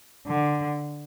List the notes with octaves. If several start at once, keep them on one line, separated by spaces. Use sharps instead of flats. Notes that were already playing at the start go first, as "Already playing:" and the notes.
D3